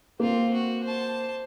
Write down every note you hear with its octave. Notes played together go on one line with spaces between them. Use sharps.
A#3 C4 F4
F#4
C5 A5